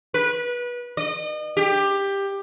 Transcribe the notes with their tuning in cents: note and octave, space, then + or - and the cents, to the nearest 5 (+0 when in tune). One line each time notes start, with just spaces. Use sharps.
B4 -25
D#5 -35
G4 +15